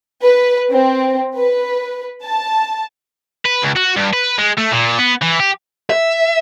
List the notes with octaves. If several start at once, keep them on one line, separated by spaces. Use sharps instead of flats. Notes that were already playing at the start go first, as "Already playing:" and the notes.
B4
C4
B4
A5
B4
C#2
F#4
G2
B4
G#3
A3
A#2
B3
E3
G4
E5